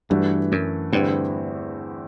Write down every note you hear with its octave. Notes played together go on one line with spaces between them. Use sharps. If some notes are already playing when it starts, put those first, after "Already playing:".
G2 E3 A3 D4 F#4
F#2
E2 G2 D3 A3 C4 E4